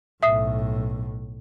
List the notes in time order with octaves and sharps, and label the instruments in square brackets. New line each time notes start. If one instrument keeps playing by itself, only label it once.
[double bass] B1 A2 [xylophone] E5 D#6 C7